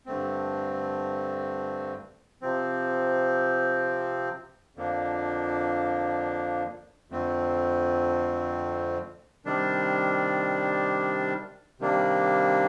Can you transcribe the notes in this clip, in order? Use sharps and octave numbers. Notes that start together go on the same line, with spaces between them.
G2 D3 A3 C4
C3 F3 C4
F2 D3 F3 A#3 D4
F2 D3 A3 C4
C3 D#3 G3 D4
C3 D#3 G3 A#3 D4